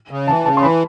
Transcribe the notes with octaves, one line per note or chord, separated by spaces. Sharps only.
C#3
E3 A5
C#3 A5
C6
E3 B5